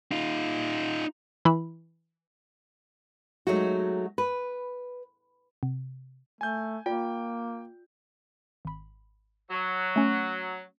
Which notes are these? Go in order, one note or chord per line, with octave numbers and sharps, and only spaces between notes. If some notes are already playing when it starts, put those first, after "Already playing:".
D#4 F4
E3 E4 B5
F#3 G#3 A3 D#4 F#4
B4
C3
A3 G#5 G6
A#3 F4 D5 G5
G#1 B5
F#3
A3 C#4